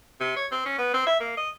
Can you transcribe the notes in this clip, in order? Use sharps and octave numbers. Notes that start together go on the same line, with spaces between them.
C3
C#5
C4
C#4
B3
C4
E5
A#3
D#5